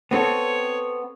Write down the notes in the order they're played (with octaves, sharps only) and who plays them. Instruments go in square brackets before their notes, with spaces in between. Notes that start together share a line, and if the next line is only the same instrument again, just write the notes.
[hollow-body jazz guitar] B3 C4 A4 [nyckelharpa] C#5